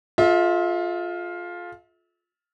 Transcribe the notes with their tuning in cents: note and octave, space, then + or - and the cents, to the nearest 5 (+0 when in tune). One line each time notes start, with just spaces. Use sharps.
F4 +10 A4 -40 E5 -35